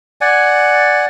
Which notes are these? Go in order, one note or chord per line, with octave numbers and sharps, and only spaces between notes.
D5 F#5 G#5